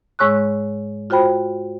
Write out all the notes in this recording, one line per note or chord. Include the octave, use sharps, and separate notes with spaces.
G#2 G#3 C#5 C#6 E6 F#6
F4 F#4 C5 G5 B5